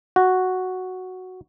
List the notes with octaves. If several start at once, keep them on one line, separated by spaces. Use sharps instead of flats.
F#4